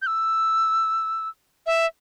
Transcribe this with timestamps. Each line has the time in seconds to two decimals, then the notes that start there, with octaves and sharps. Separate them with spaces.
0.02 G6
0.07 E6
1.66 E5